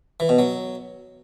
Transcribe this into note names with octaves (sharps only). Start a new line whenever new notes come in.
E3
B2
F#3